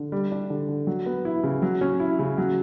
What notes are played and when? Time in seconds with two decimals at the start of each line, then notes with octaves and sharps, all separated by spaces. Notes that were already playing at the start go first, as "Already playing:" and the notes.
Already playing: D3
0.12 G3
0.32 D4
0.50 D3
0.69 D3
0.87 F#3
1.06 B3
1.25 E4
1.44 C#3
1.62 F#3
1.81 C#4
2.00 E4
2.19 C#3
2.38 F#3